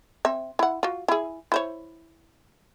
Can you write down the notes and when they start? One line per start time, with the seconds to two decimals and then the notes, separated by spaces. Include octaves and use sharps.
0.25 C4 E5
0.59 E4 F#5
0.83 F4 F#4
1.08 E4 G#4
1.52 E4 C5 C#5